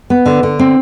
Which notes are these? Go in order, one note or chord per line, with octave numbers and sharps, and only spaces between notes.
B3
D3
D3
C4